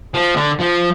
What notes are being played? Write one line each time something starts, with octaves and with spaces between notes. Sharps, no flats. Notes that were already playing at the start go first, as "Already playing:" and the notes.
F3
D3
F3